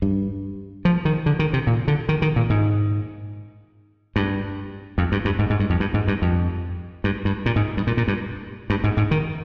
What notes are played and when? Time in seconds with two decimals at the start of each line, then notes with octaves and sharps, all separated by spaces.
0.02 G2
0.85 F3
1.05 D#3
1.26 D3
1.39 D#3
1.53 C3
1.67 A#2
1.88 D3
2.09 D#3
2.22 D#3
2.36 A#2
2.50 G#2
4.16 G2
4.98 F2
5.12 G2
5.25 G2
5.39 G#2
5.50 G#2
5.60 G2
5.70 F2
5.80 G2
5.94 G#2
6.08 G2
6.22 F2
7.04 G2
7.25 G2
7.46 A#2
7.56 G#2
7.77 G2
7.87 A#2
7.97 A#2
8.08 G2
8.70 G2
8.84 G#2
8.97 G#2
9.11 D#3